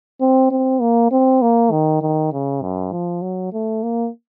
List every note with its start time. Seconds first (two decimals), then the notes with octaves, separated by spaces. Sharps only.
0.21 C4
0.51 C4
0.81 A#3
1.12 C4
1.42 A#3
1.71 D#3
2.02 D#3
2.33 C#3
2.62 F#2
2.92 F3
3.22 F#3
3.53 A3
3.83 A#3